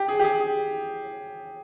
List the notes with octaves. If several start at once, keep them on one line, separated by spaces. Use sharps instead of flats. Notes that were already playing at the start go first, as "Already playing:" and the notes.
Already playing: G4
G#4
G4
G#4